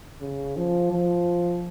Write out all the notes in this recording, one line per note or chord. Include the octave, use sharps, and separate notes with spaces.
C#3
F3
F3